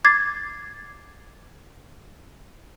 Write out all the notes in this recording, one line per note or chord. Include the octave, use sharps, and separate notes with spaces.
D6 G#6 A6 C7